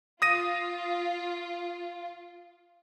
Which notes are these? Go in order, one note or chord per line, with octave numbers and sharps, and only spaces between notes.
F4 D#6 A#6 D#7